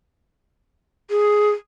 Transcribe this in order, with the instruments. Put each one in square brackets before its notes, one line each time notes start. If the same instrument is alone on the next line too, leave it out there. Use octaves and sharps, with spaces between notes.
[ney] G#4